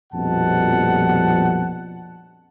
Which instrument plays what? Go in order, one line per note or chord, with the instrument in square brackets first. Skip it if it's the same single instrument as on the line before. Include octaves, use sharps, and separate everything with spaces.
[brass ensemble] A#1 F2 B2 G3 F#5 A5